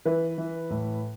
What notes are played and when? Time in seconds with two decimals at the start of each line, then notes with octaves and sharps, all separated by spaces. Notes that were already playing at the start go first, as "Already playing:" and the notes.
0.05 E3 B4
0.38 E3
0.70 A2